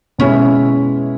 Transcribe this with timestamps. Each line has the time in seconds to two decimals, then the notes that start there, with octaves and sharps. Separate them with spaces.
0.19 B2 G#3 C#4 E4